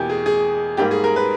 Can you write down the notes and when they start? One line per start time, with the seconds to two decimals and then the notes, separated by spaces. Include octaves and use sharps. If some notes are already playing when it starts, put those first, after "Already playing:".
Already playing: E2 B2 A#3 G4
0.10 G#4
0.26 G#4
0.77 G#2 G3 A#3 G4
0.91 G#4
1.04 A#4
1.16 B4